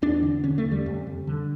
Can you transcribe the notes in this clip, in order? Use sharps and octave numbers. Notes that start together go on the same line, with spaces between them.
E2 D4
D3
D3 C#4
A3
E2
G3
F2
D3
D3